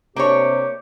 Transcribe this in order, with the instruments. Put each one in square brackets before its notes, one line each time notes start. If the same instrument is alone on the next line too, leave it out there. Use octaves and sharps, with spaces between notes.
[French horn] C3 [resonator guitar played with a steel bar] A#3 D4 C#5 [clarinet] G4